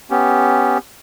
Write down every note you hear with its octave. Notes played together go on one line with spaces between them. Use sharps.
B3 C#4 G4